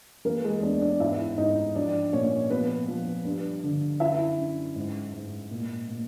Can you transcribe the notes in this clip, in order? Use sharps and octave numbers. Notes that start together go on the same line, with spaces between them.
E3 A#3 A#4
G#3 G#4
E2 D4 D5
D4 D5
G#2 E4 E5
G#2 D#4 D#5
F3 D4 D5
A#2 C#4 C#5
F3 B3 B4
F3
G2
D3
F#2 E4 E5
F#2
G#2
G#2
A#2
A#2